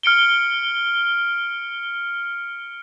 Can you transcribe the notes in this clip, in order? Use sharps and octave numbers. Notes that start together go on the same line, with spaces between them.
F6 C#7 D7 G7